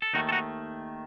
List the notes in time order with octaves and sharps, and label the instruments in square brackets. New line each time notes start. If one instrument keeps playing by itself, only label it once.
[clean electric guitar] A4
D#2 D#3 A3 D#4 F#4
A4
D#4 F#4